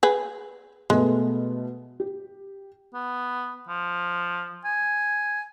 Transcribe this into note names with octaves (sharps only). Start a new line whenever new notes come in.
G#4 B4
B2 G#3 A3 B3
G4
B3
F3
G#5